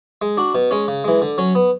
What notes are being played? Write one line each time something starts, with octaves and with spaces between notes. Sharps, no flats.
G#3
D4 F#4
B2
G#3 C#4
C#3
E3 G#3
D3
F#3 C#4
B3